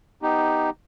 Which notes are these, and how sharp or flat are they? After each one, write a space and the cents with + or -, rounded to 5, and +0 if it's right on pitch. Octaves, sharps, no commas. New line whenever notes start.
B3 +0 D#4 +0 G4 +0